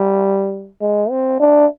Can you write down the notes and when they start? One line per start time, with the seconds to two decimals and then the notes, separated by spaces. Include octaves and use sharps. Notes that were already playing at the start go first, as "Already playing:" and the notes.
Already playing: G3
0.81 G#3
1.10 C4
1.40 D4